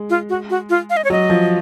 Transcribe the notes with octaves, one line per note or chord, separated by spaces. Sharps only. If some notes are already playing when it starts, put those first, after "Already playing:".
Already playing: G#3
F4
F#4
F#4
F4
F5
D#5
C#5
F#3 D#5
F3